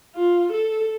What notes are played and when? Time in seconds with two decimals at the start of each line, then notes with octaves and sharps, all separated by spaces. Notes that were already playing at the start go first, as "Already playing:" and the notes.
0.16 F4
0.52 A4